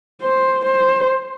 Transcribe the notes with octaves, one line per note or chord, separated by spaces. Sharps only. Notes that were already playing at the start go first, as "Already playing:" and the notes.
C5
C5